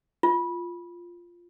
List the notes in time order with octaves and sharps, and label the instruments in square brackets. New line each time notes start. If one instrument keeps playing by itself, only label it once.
[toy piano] F4